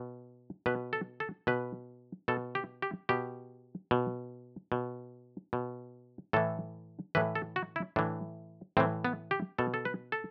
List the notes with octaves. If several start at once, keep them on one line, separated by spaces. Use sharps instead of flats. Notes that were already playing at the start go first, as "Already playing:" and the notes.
Already playing: B2
B2 B4
A4
A4
B2 B4
B2 A4
G4
G4
B2 G4
B2
B2
B2
A2 E3 A4
A2 E3 B4
A4
F#4
E4
A2 E3 D4
A2 E3 C4
B3
G4
B2 A4
A4
B4
A4